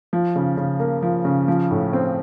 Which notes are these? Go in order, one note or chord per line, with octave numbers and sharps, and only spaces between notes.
F3
C#3
C#3
A#3
F3
C#3
F3
A2
C4